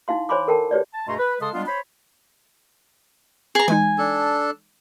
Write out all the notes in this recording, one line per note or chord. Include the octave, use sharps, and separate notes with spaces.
D#4 E4 F5 C6
C5 C#5 G#5 B5 C6 D6
A4 A#4 G5 A5
G4 B4 C#5 D5
A5
G2 B2 A3 G#4 A#5 C6
B4
C#3 G#3 A4 A5 C6 D#6
G3 G#3 B3 D4 F4
C5 C#5 B5
G#4 A#5
E3 G#3 D#4 G#5
D4 A4